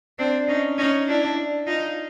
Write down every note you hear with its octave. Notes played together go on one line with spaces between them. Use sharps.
C4 D4
C#4 D#4
C#4 D#4
D4 E4
D#4 F4